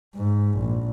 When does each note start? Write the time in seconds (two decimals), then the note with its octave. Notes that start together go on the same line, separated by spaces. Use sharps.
0.16 G#2
0.59 A#1